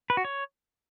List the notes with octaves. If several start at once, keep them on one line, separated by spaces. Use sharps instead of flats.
B4
F#4
C#5